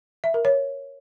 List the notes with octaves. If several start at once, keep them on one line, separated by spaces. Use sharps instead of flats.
E5
A#4
C#5